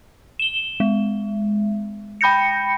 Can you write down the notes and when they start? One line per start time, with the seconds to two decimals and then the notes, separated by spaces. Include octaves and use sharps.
0.39 E7 G7
0.80 G#3
2.21 G5 B5 G6 A#6 C#7